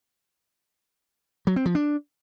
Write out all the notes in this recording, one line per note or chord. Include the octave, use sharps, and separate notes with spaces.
F#3
C4
F3
D4